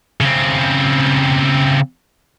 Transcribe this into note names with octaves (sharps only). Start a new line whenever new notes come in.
C#3 C4